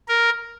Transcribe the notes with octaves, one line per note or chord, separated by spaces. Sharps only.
A#4